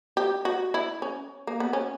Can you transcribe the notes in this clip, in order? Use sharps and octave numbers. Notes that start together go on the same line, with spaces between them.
G4
F#4
E4
C#4
A#3
B3
C#4